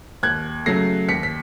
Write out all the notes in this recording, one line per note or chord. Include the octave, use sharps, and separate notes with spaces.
D#2 F#6 G#6
C#3 F#3 A3 A#6 C7
D#2 B6 C#7
B6